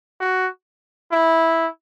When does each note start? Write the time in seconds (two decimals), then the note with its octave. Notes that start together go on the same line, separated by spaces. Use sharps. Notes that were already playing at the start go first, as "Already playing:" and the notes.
0.20 F#4
1.12 E4